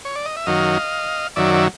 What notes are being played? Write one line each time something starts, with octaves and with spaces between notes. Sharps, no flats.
C#5
D5
D#5
E5
F#2 D#3 F#3 D#5 F5
F#2 D#3 F#3 D5 E5
E5